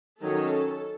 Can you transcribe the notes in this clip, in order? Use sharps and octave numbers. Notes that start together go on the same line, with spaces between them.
D#3 F#3 C#4 A4